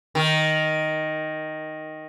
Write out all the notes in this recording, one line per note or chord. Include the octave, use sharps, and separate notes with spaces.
D#3